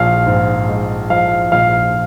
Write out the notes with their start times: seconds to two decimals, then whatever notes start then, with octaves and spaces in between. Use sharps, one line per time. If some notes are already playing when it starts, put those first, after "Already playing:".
Already playing: A#1 F3 F5
0.27 G#2
0.69 G#3
1.10 F3 F5
1.52 A#1 F5